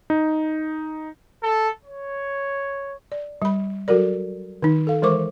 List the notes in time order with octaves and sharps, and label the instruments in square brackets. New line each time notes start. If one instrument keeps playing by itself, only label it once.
[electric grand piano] D#4
[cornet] A4
C#5
[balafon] D5
G3 B5
F#3 F#4 A4 A#4 D5
D#3 D#4
A4 F5
E3 G#3 A#4 C5 C#6 D6